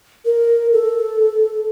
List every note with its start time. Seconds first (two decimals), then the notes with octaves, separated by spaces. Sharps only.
0.25 A#4
0.73 A4